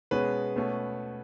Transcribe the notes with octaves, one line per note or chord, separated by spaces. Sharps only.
B2 G#3 C#4 B4
B2 A3 C#4